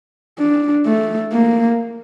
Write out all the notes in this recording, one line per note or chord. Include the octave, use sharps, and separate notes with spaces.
D4
A3
A#3